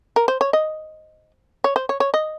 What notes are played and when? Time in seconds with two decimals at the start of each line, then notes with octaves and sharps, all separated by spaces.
0.16 A#4
0.28 C5
0.41 C#5
0.53 D#5
1.64 C#5
1.76 C5
1.89 C#5
2.00 C#5
2.14 D#5